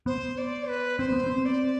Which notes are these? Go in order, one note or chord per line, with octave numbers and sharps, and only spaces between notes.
B3 C5
D5
B4
C4 C5
B3
C4
D5